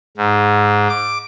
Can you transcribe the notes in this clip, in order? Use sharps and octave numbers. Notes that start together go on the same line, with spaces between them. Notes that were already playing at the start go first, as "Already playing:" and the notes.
G#2
D6